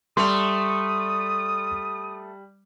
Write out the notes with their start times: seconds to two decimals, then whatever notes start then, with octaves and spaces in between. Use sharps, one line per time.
0.17 G3 A3 A4 C6 D#6 F7